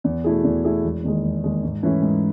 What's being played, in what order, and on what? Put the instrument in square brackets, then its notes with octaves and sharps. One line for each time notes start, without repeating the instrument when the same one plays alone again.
[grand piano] E2
B2 A3 E4 G#4
E2
B2 A3 E4 G#4
E1
D#2 D#3 G#3
E1
D#2 D#3 G#3
G#2
E3 A3 C#4 E4
G#2